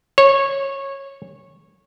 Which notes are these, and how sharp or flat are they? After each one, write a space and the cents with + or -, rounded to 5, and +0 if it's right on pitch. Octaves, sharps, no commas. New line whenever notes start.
C#5 -15